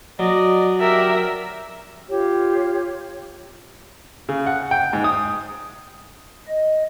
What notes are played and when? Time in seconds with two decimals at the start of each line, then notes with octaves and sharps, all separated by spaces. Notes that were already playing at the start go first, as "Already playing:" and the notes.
0.19 F#3 D5 D#5
0.80 G4 A#4 D5 E5
2.10 F4 G4 C#5
4.29 C#3
4.46 F#5
4.71 G5
4.93 G#2
5.04 D#6
6.47 D#5